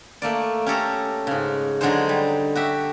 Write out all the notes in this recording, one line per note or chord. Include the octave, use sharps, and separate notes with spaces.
A3 A#3 D5
C#4 G4 A4 A#5
G#2 C#3
D3 F#3 G#3 D#4 G#4 C5
G3
F#4 G4 E5